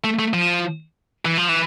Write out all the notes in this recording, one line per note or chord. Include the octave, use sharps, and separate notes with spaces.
A3
A3
F3
E3
F3
E3